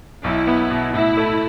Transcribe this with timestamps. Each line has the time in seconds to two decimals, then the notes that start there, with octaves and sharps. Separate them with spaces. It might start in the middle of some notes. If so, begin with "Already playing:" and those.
0.24 B1 E4
0.47 B3
0.70 B2
0.94 A2 E4
1.17 A3